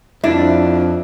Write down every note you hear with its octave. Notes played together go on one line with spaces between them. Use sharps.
F2 D4 E4